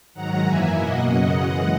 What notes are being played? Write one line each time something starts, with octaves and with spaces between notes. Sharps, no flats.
G#2 D#3 F#3 F#5 A#5
F#2 E3 A#3 E5 G#5
B2 A#3 D#5 F#5
F#2 C#3 F#3 D#5 F#5
F#2 E3 G#3